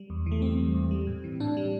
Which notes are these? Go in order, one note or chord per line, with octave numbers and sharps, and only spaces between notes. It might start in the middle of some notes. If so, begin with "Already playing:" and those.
Already playing: G3
E2
E3
A3
E2 C4
G3
E2
G3
A2
E3
A2 D4
G3